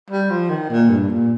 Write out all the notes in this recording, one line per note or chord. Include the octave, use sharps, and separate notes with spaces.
G3
F3
D#3
A#2
G2
A#2